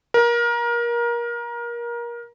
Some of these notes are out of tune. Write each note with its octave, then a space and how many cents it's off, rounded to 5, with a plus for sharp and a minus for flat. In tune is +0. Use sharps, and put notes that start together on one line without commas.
A#4 +25